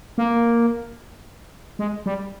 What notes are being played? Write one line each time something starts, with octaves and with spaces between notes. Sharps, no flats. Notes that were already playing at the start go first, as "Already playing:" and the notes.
A#3
G#3
G3